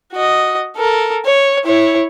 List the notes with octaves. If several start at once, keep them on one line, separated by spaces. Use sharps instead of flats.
F#4 D#5
A4 A#4
C#5
E4 C#5